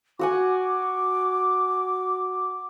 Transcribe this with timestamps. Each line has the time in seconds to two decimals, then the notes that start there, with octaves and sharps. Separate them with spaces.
0.19 F#4 F#5 G#5 D6